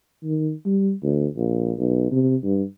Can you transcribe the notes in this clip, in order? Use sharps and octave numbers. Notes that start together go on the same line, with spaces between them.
D#3
G3
D2
A#1
B1
C3
G2